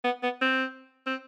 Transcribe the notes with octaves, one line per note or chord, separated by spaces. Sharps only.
B3
B3
C4
C4